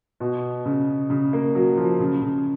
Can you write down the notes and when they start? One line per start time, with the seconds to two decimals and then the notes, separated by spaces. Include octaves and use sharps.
0.20 B2
0.66 C#3
1.10 C#3
1.33 A#3
1.55 F#3
1.77 F3
2.00 C#3
2.22 C#3